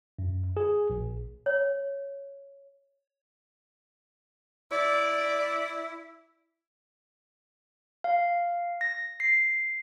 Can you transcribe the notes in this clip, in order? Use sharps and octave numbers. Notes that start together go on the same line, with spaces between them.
F#2
G#4
A#1
C#5
E4 D5
F5
A#6
C7